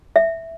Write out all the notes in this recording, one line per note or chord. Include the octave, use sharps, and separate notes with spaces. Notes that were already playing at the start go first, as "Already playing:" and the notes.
E5